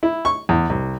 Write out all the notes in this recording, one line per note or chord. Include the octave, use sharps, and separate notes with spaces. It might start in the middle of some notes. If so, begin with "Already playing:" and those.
E4
C#6
E2
C2